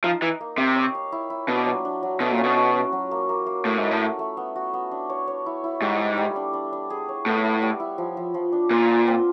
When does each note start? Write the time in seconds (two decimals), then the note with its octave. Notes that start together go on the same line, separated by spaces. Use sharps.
0.04 F3 D#4
0.21 E3 D#4
0.41 A#3
0.58 C3 G4
0.76 C#5
0.95 F5
1.12 E4
1.30 E4
1.48 B2 D4
1.66 F#3
1.85 D4
2.03 F#3
2.20 B2 A3
2.32 A#2
2.38 C#4
2.44 B2
2.57 F#4
2.75 C#4
2.92 F#3
3.11 A#3
3.29 A#3
3.46 A#3
3.65 A2 A3
3.78 G#2
3.83 E4
3.91 A2
4.01 A3
4.19 A3
4.37 B3
4.56 F#4
4.74 B3
4.91 D4
5.10 C#5
5.28 C#5
5.46 E4
5.64 E4
5.82 G#2 G3
6.00 G3
6.17 G3
6.36 D4
6.53 D4
6.73 D4
6.90 G#4
7.09 C#5
7.26 A2 B3
7.44 E4
7.62 G3
7.80 E4
7.98 F3
8.17 F3
8.34 F3
8.52 D4
8.71 A#2 F4
8.89 F4
9.07 C4